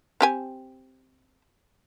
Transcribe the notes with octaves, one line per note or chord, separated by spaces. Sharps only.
C4 G4 G#5